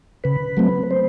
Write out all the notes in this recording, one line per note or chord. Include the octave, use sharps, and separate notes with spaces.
C#3 B4
F#3 A3 C4
C5